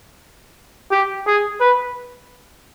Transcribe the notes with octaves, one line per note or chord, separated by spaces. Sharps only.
G4
G#4
B4